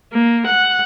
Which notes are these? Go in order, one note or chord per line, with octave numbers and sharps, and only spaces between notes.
A#3
F#5